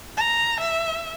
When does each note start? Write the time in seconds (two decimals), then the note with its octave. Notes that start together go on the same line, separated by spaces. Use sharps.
0.17 A#5
0.60 E5